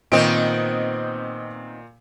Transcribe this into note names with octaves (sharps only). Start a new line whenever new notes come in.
A#2 D#3 B3 C4 D#5 C#6 D7